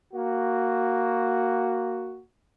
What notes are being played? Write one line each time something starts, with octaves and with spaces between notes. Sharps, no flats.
A#3 F#4